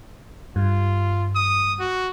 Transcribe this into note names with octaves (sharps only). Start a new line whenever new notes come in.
G2 F4
D#6
F#4